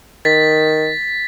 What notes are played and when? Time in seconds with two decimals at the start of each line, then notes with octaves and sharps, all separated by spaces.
0.25 D#3 A6 B6